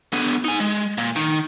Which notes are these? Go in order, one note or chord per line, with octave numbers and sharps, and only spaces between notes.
D3 B3
D#4 G#5
G#3
A#2
D#3